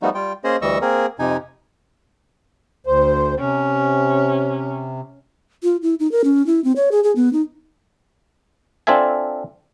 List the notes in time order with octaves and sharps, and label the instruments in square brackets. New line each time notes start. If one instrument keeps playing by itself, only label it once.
[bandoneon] F3 G3 A3 B3 D#4 F#4
G3 F4 G5
A#3 C#4 G#4 C5 D#5
D2 E3 G3 D#5 C#6 E6
A#3 C4 G#4 A#4
F2 C3 D#4 G#5
[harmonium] D2 C5
[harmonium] C3 [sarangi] C#4
[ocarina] F4
E4
D#4
A#4
C#4
E4
C4
C#5
G#4
G#4
B3
D#4
[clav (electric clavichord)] C4 D4 F4 A4 E5 G#5